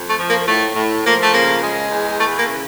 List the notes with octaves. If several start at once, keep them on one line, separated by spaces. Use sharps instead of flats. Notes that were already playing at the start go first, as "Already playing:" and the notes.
Already playing: F2
A3
F3
A#3
A2 A3
A2
F3 A#3
A3
C#3 A#3
G#3
E2
E3 A3
A#3
C#3